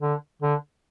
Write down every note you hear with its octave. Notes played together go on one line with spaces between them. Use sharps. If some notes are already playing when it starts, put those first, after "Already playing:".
D3
D3